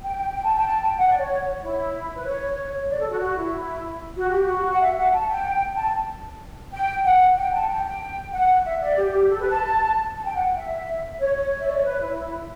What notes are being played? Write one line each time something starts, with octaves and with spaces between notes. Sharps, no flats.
G5
G5
G5
A5
G5
A5
G5
F#5
D5
C#5
E4
B4
C#5
D5
A4
F#4
F#4
E4
F#4
G4
F#4
F#5
E5
F#5
A5
G5
A5
G5
F#5
G5
A5
G5
G5
F#5
E5
D5
G4
G4
A4
B4
A5
A5
G5
F#5
E5
C#5
C#5
E5
D5
C#5
B4
E4